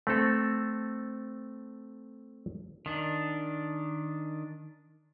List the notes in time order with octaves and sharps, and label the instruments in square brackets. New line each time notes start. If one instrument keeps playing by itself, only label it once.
[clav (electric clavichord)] A3 C4 A4
[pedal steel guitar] D#3 D4